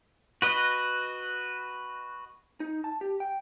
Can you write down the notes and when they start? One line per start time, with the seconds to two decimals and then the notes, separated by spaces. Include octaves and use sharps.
0.42 F#4 B4 D#5
2.60 D#4
2.84 A5
3.01 G4
3.20 G5